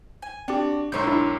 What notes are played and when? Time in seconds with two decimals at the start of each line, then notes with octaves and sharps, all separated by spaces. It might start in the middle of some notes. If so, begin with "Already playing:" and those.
0.22 G#5
0.48 C4 D4 F#4 G4 D5
0.92 B1 G#2 A#4 C#5 E5 C6 G6
1.04 D4 E4